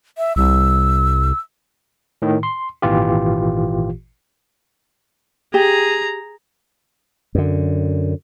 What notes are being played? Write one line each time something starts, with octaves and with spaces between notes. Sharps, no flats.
E5
C2 E6
A2 D#3
C6
G#1 A#2 E3 F4 G4
G4 G#4 A#5
F#2 D3